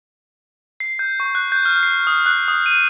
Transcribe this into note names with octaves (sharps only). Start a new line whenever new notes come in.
C7
G6
C#6
F#6
G6
F6
C7
D#6
F#6
D#6
D#7